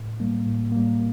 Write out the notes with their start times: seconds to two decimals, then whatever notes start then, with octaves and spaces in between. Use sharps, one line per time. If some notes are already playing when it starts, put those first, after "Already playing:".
Already playing: A2
0.20 G3 A#3
0.46 A2
0.72 G3 A#3